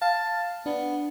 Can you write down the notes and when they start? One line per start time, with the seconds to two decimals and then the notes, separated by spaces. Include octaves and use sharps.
0.02 F5 A5
0.66 B3 D4